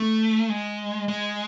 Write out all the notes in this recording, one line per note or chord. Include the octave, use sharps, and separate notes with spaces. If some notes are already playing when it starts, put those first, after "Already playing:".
Already playing: A3
G#3
G#3